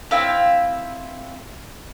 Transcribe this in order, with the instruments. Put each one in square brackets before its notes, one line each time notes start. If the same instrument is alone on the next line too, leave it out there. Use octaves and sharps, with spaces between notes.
[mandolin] C4 E4 E5 F5